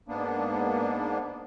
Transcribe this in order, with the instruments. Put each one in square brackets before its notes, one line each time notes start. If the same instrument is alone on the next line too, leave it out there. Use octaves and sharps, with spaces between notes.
[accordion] G#2 A#3 B3 D4